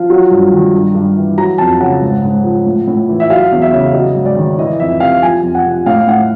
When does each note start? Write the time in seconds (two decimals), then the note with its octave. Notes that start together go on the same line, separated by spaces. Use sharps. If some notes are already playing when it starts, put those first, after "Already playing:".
Already playing: F3 F5
0.10 F#3
0.31 G2
0.53 D#3
0.73 G2
0.95 G2
1.17 E3
1.37 F#3 A#5
1.58 F2 A5
1.80 C#3 F#5
2.01 G#2
2.23 G#2
2.44 F3
2.66 A2
2.87 A2
3.09 E3
3.20 E5
3.30 F#3 F5
3.52 E2
3.62 E5
3.72 C#3
3.93 F#3 D#5
4.16 G#2
4.26 D5
4.36 D#3
4.59 E3 D#5
4.79 F2 E5
5.00 C3 F5
5.23 F3 G#5
5.43 F2
5.55 F#5
5.64 C3
5.86 A2 F5
6.07 A2 F#5